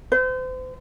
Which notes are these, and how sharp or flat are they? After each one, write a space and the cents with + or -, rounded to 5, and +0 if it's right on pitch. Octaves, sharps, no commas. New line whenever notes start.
C5 -40